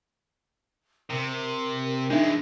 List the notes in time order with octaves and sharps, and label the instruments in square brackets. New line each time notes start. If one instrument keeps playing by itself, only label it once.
[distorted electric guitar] C3 [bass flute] A#4
[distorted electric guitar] E3 G#3 [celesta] D4 D#4 E5